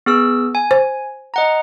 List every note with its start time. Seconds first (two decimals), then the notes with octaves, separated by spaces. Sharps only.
0.06 B3 G#4 E6
0.55 G#5
0.71 C5
1.34 D#5 F#5 A#5